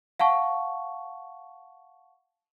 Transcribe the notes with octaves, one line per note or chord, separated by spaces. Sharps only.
F5 F#5 A5 C#6